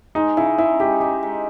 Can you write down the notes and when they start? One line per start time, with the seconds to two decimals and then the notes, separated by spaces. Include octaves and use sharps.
0.15 G#3 D#4
0.37 C#3 E4
0.58 C#3 E4
0.80 G#3 G4
1.00 D#4 G4
1.23 G#3